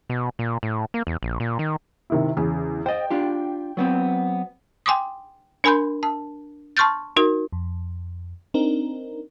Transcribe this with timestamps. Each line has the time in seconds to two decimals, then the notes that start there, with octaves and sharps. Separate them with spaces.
0.10 B2
0.39 A#2
0.63 A2
0.94 A#3
1.07 E2
1.23 A#1
1.40 A#2
1.59 D#3
2.10 C3 D#3 E4
2.37 E2 C#3
2.86 C5 D#5 G5
3.11 D4 F4 G4
3.77 F#3 B3 C4
4.86 G5 G#5 C6 D6 D#6
5.64 D4 A#4 G#5 B5 C6 G6
6.03 A5
6.77 A5 C6 C#6 F6 G6 A6
7.16 D#4 F#4 A#4
7.52 F2
8.54 C4 D4 D#4 A#4